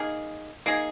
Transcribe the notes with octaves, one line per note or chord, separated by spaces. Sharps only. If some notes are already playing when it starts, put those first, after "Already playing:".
Already playing: A#3 D#4 G#4
A#3 D#4 G#4